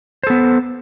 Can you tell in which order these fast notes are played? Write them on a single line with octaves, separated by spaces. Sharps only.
C5 A4 B3